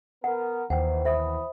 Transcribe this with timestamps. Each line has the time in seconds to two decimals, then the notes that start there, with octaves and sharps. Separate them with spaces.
0.24 B3 A#4 F#5
0.70 D#2 D#3 E3 C5 F#5 G5
1.05 B2 E3 C5 E5 B5 D#6